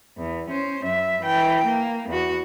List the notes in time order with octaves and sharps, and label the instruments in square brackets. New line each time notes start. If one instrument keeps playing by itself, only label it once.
[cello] E2
C#4 C5
F#2 E5
E3 G5
A#3
E2 F#4